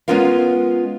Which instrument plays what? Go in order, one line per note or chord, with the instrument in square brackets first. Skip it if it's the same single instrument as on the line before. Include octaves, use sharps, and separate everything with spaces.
[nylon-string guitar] G#3 B3 C#4 F4 A#4 F5